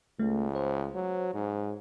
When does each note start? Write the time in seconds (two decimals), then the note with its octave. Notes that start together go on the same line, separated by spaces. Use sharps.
0.19 C#2 A3
0.55 C5
0.95 F#3
1.34 G#2